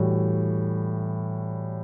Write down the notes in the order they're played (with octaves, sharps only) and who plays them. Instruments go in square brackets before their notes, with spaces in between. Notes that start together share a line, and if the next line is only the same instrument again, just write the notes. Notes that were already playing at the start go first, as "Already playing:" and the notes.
Already playing: [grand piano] A2 E3 G3 F#4